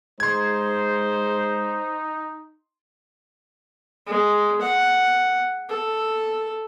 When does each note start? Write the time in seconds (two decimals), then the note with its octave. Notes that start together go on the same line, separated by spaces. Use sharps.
0.20 G#3 D#4 C5 C6 G#6
4.07 G#3
4.61 F#5
5.69 A4